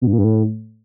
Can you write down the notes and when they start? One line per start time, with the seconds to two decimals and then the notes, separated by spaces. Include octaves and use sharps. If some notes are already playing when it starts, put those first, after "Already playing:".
0.01 B2
0.07 G2
0.13 A#2
0.18 G2
0.24 A2